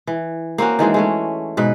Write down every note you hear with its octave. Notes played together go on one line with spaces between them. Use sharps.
E3
A#3 C4 C#4 F#4
D#3 E3 G#3 C4
G#3 A3 C#4
G#2 B2 B4